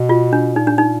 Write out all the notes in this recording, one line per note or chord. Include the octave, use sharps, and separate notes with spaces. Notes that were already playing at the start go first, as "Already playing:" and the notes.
Already playing: B2
F4
D4
A#2 D#4
D4
D#4